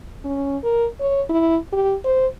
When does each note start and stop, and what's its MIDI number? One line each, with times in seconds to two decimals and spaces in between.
0.24 0.57 61
0.64 0.86 70
1.00 1.21 73
1.30 1.57 64
1.72 1.96 67
2.05 2.27 72